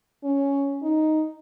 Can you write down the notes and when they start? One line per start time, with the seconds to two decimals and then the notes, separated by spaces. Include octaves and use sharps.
0.24 C#4
0.83 D#4